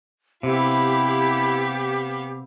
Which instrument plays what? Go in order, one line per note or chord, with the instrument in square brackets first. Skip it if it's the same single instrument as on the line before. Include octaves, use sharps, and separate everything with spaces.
[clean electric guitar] C3 [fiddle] B3 F5 [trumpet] E4 [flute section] G4